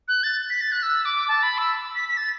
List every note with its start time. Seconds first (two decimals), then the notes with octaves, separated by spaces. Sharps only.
0.08 F#6
0.23 A6
0.50 B6
0.61 A6
0.72 F#6
0.83 E6
1.05 D6
1.28 A5
1.43 B5
1.58 E6
1.95 B6
2.09 B6
2.17 A6